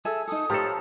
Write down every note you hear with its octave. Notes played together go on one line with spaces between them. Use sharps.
G#4 A4 E5 E6
D#4 A4 D#6
F3 G4 A4 B4 C#5 A#5